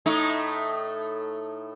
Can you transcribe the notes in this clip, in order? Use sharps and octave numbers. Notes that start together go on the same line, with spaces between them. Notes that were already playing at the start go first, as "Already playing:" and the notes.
A2 A3 D#4